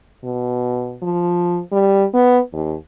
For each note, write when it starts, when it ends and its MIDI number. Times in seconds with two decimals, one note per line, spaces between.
0.24 0.97 47
1.03 1.60 53
1.72 2.04 55
2.14 2.38 59
2.53 2.75 39